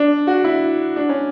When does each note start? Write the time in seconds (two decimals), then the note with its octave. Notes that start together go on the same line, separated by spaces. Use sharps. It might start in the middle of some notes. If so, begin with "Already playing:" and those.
Already playing: D4
0.27 F#4
0.44 E4
0.96 D4
1.09 C#4